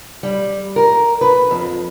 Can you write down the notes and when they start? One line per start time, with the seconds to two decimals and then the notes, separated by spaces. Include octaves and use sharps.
0.23 G3
0.76 A#4
1.21 B4
1.51 F2